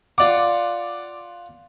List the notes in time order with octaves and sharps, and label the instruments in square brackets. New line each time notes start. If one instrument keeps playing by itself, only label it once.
[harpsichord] F4 F#5 [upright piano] D5 D6